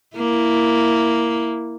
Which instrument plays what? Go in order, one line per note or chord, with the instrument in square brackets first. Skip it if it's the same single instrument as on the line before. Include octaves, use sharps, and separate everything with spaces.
[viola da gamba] A#3 E4